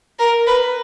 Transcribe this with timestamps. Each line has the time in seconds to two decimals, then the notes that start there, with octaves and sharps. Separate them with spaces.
0.19 A#4
0.47 B4